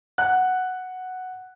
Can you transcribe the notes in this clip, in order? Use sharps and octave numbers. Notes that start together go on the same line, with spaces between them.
F#5 F#6